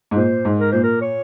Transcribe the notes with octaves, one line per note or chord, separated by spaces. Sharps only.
G#2
A#2 C5
G#2
A#4
A#2 C5
A#4
C#5